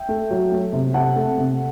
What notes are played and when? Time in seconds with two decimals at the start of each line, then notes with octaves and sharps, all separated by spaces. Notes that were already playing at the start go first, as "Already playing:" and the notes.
Already playing: E5 G5
0.09 A3
0.31 F#3
0.52 A3
0.73 C3
0.94 C3 F#5 A5
1.16 A3
1.38 C3